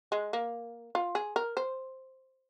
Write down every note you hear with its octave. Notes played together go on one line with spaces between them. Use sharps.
G#3
A#3
F4
G#4
A#4
C5